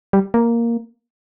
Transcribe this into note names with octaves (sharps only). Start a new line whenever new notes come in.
G3
A#3